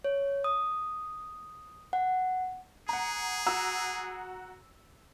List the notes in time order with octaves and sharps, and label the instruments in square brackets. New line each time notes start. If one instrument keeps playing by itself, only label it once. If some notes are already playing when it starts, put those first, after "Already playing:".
[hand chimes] C#5
D#6
F#5
[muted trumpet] G#4 [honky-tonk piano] F#5 A#5
[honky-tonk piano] F#4 A#5 E6